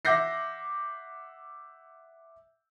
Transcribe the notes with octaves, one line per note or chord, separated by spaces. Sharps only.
E5 F#5 D6 G6 A#6 C7